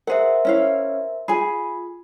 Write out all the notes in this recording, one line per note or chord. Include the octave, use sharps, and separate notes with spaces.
G#4 A#4 C5 E5 F#5
C#4 E4 F5
F4 G#4 G#5 B5